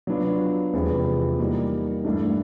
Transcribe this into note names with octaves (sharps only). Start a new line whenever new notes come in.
F#3 B3 D4 F4
E2 C3 F3 G#3 B3
E3 G3 A#3 D#4
G2 E3 A3 D4